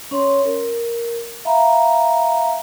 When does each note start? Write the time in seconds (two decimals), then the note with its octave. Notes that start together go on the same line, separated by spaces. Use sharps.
0.11 C#4 C#5 C6
0.45 A#4
1.45 E5 F5 A#5 B5